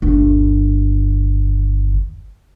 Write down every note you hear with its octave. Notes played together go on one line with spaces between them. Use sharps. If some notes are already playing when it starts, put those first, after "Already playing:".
G1 D#2